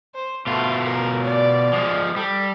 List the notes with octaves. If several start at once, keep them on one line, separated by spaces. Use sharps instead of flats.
C5
B2 A3 F4
A#4
D5
F3 G#3
G3 A4